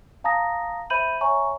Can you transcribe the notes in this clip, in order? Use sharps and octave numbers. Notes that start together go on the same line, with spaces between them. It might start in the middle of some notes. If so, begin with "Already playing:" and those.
F5 A5 A#5 D#6 A#6
C5 E5 B5 G6 D#7 F#7
C#5 E5 G#5 A#5 C#6